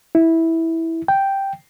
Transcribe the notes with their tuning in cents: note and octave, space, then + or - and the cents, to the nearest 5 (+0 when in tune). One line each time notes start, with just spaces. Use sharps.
E4 -10
G5 +0